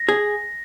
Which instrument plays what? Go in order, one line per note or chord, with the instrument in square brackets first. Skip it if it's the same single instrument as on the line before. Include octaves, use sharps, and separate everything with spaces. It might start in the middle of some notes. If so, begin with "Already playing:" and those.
Already playing: [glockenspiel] A#6
[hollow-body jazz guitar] G#4